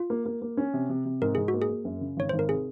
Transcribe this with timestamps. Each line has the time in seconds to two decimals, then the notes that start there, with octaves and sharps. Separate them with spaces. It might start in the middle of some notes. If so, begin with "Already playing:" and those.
Already playing: F4
0.10 A#3
0.26 A#3
0.42 A#3
0.57 C#4
0.74 C3
0.90 C3
1.05 C3
1.22 G#2 A#4
1.35 G#2 G#4
1.48 F#4
1.54 A#3
1.62 G#4
1.69 A#3
1.85 F#2
2.01 C#3
2.17 G#1 C#5
2.29 G#1 C5
2.39 A#4
2.49 C3 G#4